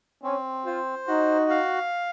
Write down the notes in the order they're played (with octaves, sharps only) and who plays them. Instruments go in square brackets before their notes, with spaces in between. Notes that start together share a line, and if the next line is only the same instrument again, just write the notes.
[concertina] C4 [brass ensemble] C#4
[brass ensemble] F4 [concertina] C5
[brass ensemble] D#4 [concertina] F#4
[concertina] F5